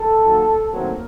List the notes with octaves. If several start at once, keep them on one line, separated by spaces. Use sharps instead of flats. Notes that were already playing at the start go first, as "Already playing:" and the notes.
Already playing: A4
D#3 F#3 A#3
D#3 F#3 A3 A#3 C4 A#4